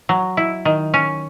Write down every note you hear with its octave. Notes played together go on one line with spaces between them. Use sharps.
F#3
E4
D#3
C#4